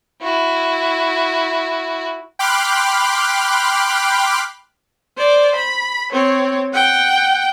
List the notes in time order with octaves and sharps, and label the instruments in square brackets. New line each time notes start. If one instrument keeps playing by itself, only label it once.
[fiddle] E4 F#4
[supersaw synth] G5 B5 C6 D6 F6 F#6
[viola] C5 D5
B5
C4 C#5
F#5 G5